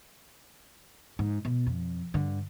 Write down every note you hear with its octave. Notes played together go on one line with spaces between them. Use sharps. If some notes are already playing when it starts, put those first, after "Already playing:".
G#2
B2
F2
G2 D3